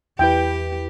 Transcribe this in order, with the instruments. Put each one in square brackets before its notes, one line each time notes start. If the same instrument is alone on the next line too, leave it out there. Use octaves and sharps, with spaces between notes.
[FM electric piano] E2 E4 B4 [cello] G4 [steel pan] G5